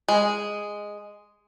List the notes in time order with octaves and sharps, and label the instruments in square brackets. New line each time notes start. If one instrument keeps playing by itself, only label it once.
[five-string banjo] G#3